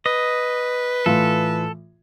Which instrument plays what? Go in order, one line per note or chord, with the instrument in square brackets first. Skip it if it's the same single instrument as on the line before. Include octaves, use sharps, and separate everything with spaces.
[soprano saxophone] B4 [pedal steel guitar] D#5
[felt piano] A2 E3 F4 [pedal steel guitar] A4